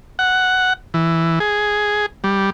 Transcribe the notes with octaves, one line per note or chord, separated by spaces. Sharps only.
F#5
E3
G#4
G3